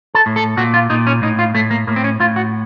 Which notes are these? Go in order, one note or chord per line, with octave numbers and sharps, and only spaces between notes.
A4
A2
A4
A#2 F#4
F4
A#2 D#4
C#4
A2 D#4
F4
A2 A3
A#3
A2 A#3
C4
C#4
A2 F4
F#4